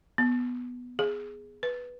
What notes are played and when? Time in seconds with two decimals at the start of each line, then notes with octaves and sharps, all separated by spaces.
0.18 B3
0.99 G#4
1.63 B4